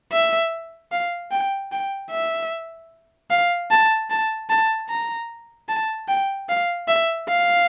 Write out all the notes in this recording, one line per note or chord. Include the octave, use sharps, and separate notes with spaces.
E5
F5
G5
G5
E5
F5
A5
A5
A5
A#5
A5
G5
F5
E5
F5